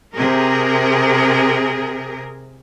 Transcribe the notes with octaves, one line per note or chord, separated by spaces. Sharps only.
C3 G#4 A#4